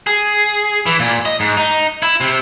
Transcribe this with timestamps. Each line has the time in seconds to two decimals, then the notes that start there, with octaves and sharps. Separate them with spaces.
0.07 G#4
0.86 E3
1.00 A#2
1.26 D#5
1.40 G#2
1.57 D#4
2.03 E4
2.21 C3